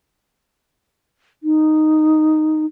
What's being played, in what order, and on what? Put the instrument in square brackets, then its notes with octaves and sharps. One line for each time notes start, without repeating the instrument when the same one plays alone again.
[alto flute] D#4